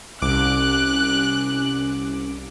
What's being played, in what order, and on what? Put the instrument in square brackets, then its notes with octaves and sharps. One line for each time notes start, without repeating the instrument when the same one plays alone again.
[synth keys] C2 D6 D7 [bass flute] C#4 [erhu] F#6